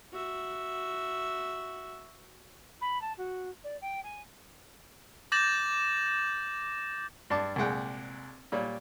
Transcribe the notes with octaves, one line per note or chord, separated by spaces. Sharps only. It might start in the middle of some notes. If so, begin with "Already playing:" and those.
F#4 E5
B5
A5
F#4
D5
G5
G#5
D6 G6 A6 A#6 E7 F#7
G2 D4 A5 D6
C2 A#2 G#3 F#5 G5
A#2 G3 C#5